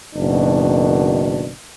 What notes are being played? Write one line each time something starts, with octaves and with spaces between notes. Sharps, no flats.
F#1 B2 D#3 D4